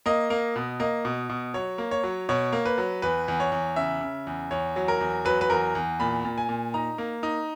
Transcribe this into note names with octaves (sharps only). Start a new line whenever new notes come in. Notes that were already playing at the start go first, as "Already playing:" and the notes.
A#3 D#5
A#3
B2
A#3 D#5
B2
B2
F#3 C#5
A#3
C#5
F#3
B2 C#5
A#3
B4
F#3
E2 B4
E2
C#5
E2
C#3 E5
C#3
E2
E2 C#5
F#3
A#4
E2
F#3 B4
B4
E2 A#4
E2
A#2 B5
A#2
G#5
A#2
D#4 A#5
A#3
D#4